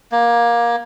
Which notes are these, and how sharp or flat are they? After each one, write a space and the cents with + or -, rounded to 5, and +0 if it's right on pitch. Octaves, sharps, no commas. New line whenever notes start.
A#3 +20